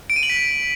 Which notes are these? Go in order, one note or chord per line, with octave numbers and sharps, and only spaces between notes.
D7
D#7
F#7
B6